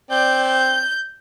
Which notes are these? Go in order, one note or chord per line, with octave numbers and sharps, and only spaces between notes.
C4 D5 G6
G6